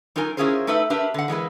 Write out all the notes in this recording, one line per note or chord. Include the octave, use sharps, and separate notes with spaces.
F#3 D#4 F4 A#4 G#5
C#4 E4 F4 G#4 A#4 C5
A3 D#4 A4 B4 E5
D4 G4 A#4 B4 E5
D3 F#5
E3 G#3 A#3 B4